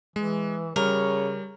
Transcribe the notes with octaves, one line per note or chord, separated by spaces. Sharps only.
E3 G#3
C#3 G3 A#4 C#5